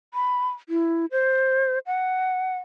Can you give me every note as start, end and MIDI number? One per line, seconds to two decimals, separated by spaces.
0.14 0.49 83
0.69 1.06 64
1.11 1.79 72
1.86 2.57 78